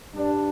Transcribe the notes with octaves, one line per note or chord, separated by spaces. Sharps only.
G2 G3 D4